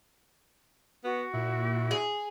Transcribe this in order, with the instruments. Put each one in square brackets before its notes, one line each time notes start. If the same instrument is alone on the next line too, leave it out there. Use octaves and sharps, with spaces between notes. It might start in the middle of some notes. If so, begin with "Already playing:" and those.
[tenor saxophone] B3 [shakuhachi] F#4
[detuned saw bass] A#2 [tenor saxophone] E4
[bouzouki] G#4